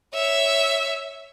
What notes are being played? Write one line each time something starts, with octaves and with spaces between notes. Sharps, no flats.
C#5 E5